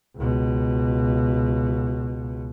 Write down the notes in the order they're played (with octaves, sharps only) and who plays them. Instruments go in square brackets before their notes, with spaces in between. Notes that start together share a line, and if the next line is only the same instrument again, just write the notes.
[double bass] C#2 B2